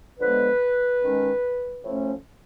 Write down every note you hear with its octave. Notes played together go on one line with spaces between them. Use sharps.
D3 F3 G#3 B3 B4
D#3 G#3 C#4
A2 F3 A3 C#4